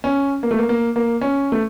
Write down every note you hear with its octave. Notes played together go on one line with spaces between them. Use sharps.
C#4
A#3
A3
A#3
A#3
A#3
C#4
A3